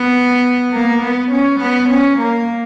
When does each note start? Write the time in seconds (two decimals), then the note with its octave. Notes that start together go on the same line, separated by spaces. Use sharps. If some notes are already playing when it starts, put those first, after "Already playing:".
Already playing: B3
0.73 A#3
1.03 B3
1.32 C#4
1.60 B3
1.90 C#4
2.19 A#3